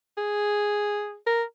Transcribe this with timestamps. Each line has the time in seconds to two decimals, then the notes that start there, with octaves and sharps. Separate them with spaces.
0.17 G#4
1.27 A#4